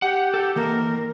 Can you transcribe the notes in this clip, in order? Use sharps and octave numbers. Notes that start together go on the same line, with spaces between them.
G4 F#5
A4
E3 A#3 A#4